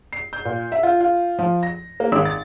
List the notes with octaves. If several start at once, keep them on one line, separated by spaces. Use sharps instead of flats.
C7
G6
A#2
E5
F4
F4
F3
A#6
A#3
G#1
A6